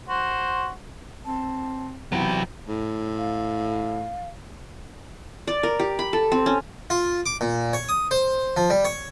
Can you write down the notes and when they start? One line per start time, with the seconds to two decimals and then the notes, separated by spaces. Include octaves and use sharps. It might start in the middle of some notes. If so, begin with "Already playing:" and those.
0.09 F#4 C5
1.26 C4 A5
2.12 C3 E3 F#3 B3 B4 G5
2.68 A2
3.18 F5
5.47 D5
5.63 A#4
5.79 G4
5.99 B5
6.13 A4
6.32 C4
6.46 C#4
6.90 F4
7.26 D6
7.41 A#2
7.73 C#5
7.89 D#6
8.11 C5
8.57 F3
8.70 G3
8.85 C#5